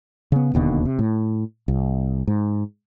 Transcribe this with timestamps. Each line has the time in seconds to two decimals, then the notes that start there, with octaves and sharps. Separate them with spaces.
0.32 C#3 B3
0.54 E1 D#2 B2 D3
0.85 C3
0.99 A2
1.68 C2
2.27 G#2